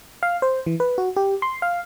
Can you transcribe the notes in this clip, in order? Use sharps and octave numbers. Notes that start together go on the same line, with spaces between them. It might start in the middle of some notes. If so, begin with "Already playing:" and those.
F5
C5
E3
B4
F#4
G4
C6
F5